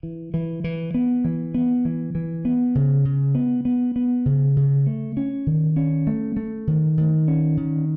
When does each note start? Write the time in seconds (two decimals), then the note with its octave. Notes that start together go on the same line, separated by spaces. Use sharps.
0.03 E3
0.34 E3
0.64 E3
0.94 B3
1.24 E3
1.54 B3
1.85 E3
2.15 E3
2.45 B3
2.75 C#3
3.05 C#3
3.35 B3
3.65 B3
3.96 B3
4.26 C#3
4.56 C#3
4.86 A3
5.17 C#4
5.47 D#3
5.76 C#4
6.07 A3
6.37 A3
6.67 D#3
6.97 D#3
7.28 C#4
7.57 D#3